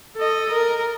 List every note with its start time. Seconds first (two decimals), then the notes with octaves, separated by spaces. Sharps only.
0.16 A4 D#5
0.52 A#4